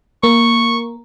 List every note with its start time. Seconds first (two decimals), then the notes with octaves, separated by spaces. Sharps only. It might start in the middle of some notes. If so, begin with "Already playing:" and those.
0.23 A#3 C#6